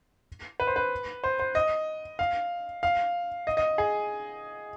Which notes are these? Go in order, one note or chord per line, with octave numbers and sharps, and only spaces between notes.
B4
C5
B4
C5
C5
D#5
F5
F5
D#5
D#5
G#4